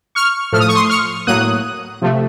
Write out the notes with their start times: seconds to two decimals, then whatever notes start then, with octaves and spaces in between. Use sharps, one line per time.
0.15 C#6 F6
0.52 A2 F3 A3 F6
0.60 D#6
0.68 C#6
0.75 C6 D#6
0.90 C#6 F6
1.27 A2 F#3 A#3 D#6 F#6
2.02 C3 F3 A3